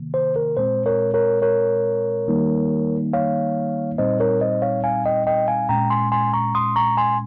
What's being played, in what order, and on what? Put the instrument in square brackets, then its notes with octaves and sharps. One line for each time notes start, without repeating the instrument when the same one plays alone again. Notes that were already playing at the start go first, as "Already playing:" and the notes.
Already playing: [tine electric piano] C3 D#3 A#3
C5
A#4
A#2 G#3 C4 C5
A#4 C#5
A#4 C#5
A#4 C#5
D#3 G3 A#3 D#4
C#5 F5
A#2 G3 C4 D#4 C5 D#5
A#4 C#5
C5 D#5
C#5 F5
F5 G#5
D#5 G5
D#5 G5
F5 G#5
A#2 G#3 C#4 G5 A#5
G#5 C6
G#5 C6
A#5 C#6
C6 D#6
A#5 C#6
G#5 C6